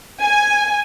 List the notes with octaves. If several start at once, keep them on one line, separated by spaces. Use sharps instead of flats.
G#5